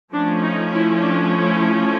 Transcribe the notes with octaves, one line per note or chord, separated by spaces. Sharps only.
F3 A3 C#4 D4
D#4
E4
D4
E4